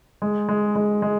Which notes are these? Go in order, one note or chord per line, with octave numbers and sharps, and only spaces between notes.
G#3
G#3
G#3
G#3